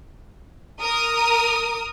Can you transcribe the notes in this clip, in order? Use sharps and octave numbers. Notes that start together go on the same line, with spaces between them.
A#4 D#6